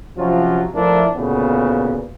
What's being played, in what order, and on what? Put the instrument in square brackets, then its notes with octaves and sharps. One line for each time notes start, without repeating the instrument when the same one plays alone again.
[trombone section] C3 F3 F#3 C#4 F4
F3 A3 D4 E4 A#4
D2 A#2 C#3 B3